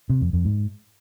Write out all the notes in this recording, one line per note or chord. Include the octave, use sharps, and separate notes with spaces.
C3
F2
F2
G#2